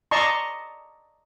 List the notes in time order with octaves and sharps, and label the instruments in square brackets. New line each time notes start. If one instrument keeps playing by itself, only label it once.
[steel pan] D5 D#5 A5 A#5 C6 C#6